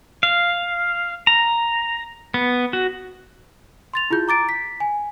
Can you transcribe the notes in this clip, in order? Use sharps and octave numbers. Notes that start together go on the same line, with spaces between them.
F5
A#5
B3
F#4
C6 A6 F7
E4 F4 G#4 G6
A#5 D6 A6 D7
B6
G#5